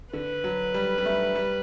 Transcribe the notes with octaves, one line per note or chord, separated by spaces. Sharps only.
D3 B4
F#3
G3
G3
A3
G3